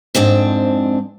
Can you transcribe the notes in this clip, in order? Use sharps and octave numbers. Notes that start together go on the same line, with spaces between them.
F2 G#2 C4 D4